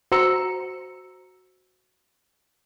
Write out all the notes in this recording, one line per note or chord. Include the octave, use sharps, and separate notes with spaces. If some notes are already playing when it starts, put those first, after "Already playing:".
F#4 C5 A#5 E6 C#7